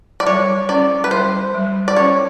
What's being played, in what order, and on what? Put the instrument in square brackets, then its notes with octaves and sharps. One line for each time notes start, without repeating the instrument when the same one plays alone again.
[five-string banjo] D5
[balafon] G3 [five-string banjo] C#5
[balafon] C#4 [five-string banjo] D5
[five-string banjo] B4
[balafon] G3 [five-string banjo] C5
[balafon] G3
[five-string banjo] D5
[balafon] C#4 [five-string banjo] C#5